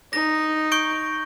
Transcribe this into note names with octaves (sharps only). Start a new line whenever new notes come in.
D#4 A#6
C#6 G6 D7